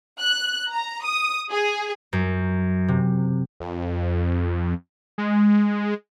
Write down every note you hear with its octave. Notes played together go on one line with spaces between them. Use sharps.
F#6
A#5
D#6
G#4
F#2
C3
F2
G#3